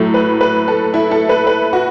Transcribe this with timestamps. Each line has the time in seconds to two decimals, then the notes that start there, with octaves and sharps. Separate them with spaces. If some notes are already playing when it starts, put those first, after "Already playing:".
Already playing: A2 F#3 A3
0.14 B4
0.41 B4
0.68 A4
0.94 E4
1.11 A4
1.29 B4
1.47 B4
1.73 F#4